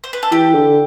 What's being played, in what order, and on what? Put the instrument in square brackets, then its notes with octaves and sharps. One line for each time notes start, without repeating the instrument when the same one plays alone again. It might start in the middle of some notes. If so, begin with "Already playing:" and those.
[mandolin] C5
B4
A4
[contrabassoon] E3 [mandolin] G4
[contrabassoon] D3